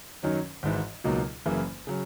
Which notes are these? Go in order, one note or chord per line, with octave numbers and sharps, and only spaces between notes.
F#2 D#3 F#3 C#4
G#1 G#2 E3
C#2 B2 F#3 A#3 D#4
F#1 F#2 C#3 E3 A#3
C#3 F#3